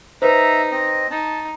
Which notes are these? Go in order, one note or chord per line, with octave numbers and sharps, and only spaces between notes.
D#4 B4 C5 E5 A#5
C4 D#5
D#4 A5